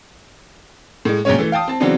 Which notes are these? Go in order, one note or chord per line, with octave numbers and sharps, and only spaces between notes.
A2 G#3
A#1 F#2 C#3 G#3 C#4 C#5
E3 A3
F5 G5 A5 D#6
C4 A5
C#3 E3 F#3 B3 C4 D4